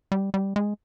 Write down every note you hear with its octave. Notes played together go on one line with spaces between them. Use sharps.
G3
G3
G#3